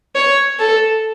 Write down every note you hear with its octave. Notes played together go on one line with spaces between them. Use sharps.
C#5
A4